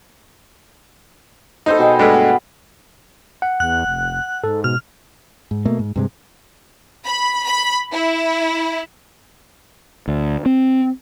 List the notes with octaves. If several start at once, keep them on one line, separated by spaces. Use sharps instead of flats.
D#4 A4 B4 C5
B2 G#4 G5
G2 G#3 A3
B3 B4
F#5
E2 F#6
F1
G#2 A4
B2 F6
G#2
B2 A3 A#3
G#2
G2 C3 G#3
B5
B5
E4
D2
C4